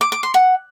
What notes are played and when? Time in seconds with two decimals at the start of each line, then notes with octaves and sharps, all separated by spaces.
0.01 D6
0.12 D6
0.23 C6
0.34 F#5